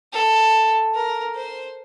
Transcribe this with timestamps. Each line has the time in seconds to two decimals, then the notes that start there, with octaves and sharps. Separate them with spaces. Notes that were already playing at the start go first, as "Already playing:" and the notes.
0.13 A4
0.94 A#4
1.35 C5